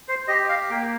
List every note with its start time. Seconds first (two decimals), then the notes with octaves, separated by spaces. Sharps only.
0.08 C5
0.28 G4 D#5
0.49 F5
0.70 A#3 G5